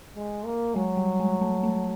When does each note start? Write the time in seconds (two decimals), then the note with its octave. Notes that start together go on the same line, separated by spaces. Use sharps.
0.16 G#3
0.45 A#3
0.75 F#3 G#3
0.97 G3
1.20 G#3
1.41 A3
1.63 A3